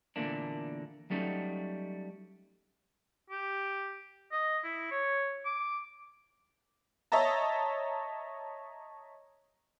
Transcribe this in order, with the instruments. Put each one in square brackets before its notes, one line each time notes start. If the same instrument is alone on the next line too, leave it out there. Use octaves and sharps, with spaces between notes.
[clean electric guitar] E2 A#2 D3 A3 A#3 D4
F#3 G3 A3 C#4 D#4 F#4
[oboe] G4
D#5
E4
C#5
D6
[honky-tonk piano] C#5 D#5 E5 A5 A#5